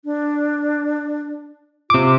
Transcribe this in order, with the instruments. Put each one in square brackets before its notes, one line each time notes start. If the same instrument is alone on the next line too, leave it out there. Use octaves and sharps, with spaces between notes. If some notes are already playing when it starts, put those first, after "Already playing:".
[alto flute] D4
[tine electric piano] C3 D6 [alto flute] F4